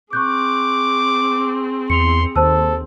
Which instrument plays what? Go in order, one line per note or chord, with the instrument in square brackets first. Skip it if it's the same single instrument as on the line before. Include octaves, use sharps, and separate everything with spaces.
[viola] C4 G#4 [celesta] C#6 F#6 G6 [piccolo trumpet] D6
[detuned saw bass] E2 [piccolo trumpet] C6 [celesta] C#7 F7
[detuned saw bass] D#2 [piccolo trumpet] A4 [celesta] C5 A5 E6